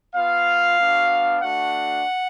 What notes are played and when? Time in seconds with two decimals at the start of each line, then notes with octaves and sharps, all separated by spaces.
0.15 B3 F4 F5
0.79 B3 D4 F#4
1.41 A3 D4 F#4 F#5